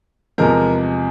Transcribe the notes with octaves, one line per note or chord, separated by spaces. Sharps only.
E2 C3 F3 G#3 A#4